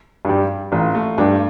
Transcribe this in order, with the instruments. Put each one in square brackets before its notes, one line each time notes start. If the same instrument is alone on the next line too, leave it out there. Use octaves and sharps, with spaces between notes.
[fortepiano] G2 G3
[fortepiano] A1 [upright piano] F4
[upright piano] A3
[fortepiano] G2 G3 [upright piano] D4